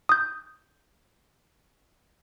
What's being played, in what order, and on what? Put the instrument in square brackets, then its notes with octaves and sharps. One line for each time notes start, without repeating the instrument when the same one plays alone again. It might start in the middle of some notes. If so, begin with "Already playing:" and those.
[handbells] D#6 G6